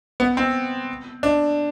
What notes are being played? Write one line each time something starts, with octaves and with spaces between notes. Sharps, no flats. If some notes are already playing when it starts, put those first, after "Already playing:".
B3
C4
D4